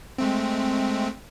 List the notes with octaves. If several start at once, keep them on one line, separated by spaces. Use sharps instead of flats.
G#3 A3 C4